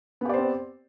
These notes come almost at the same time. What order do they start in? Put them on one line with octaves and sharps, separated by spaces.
B3 G4 D5 C5 C4